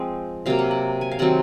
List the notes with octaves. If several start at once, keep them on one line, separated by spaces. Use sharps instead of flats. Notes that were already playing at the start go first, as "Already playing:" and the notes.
Already playing: F3 G#3 C4
C3 F#3 A#3 F5
F#5
F#5
G#5
F5
C3 D#3 F#3 C4 F#5